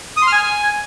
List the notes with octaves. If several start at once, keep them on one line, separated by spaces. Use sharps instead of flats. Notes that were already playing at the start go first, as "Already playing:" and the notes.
D#6
C6
F6
G#5